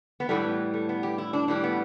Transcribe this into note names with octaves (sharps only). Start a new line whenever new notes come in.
B3
A2 E3 G3 A3
B3
A3
B3
G4
E4
D4
A2 E3 G3 D4
B3